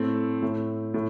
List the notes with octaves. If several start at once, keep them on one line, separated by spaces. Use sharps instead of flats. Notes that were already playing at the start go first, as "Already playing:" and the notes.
Already playing: A2 A3 C4
A2
A2